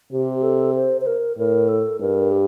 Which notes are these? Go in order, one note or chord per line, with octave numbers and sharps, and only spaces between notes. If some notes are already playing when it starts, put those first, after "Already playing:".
C3 G4
A4
C5
C5
A#4
A2 A#4
A4
G2 A#4
G4